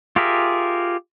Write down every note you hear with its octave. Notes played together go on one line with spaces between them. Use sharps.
F4 G4 G#4 A#4 E5